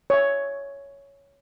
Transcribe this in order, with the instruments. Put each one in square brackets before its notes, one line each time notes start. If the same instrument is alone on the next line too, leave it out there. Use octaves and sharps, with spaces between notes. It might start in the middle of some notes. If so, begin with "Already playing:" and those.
[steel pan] C#5 E5